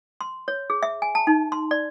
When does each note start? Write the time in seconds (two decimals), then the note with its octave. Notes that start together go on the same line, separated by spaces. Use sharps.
0.21 C6
0.48 C#5
0.70 G#4
0.83 E5
1.02 G#5
1.15 A5
1.27 D#4
1.52 C6
1.71 D5